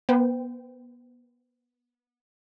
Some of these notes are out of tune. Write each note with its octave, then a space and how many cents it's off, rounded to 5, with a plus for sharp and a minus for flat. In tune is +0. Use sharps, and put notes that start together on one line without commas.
B3 -25 C5 -45 G5 +0